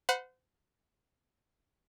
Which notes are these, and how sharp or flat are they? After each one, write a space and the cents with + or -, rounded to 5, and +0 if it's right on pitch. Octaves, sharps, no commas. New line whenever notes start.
C5 -35 F#5 -15 B5 -15